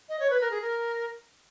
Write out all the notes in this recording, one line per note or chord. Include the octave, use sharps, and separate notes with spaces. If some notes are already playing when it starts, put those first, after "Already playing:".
D#5
C#5
B4
A#4
G#4
A#4